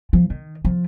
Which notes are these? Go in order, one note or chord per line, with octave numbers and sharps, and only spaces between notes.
F3
D#3
F3